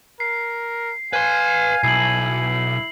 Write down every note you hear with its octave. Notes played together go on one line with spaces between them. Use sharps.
A#4 C7
B4 F5 G#5 C6
B1 E4 C7 F#7